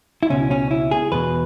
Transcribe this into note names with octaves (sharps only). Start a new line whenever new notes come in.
E4
C#2 B2 C#4
C#4
E4
G#4
E2 B2 B4